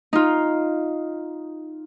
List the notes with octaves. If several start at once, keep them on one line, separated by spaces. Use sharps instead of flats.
D#4 F4